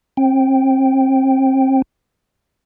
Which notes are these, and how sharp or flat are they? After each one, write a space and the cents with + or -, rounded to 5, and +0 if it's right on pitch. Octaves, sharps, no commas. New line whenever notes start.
C4 +35 G5 +0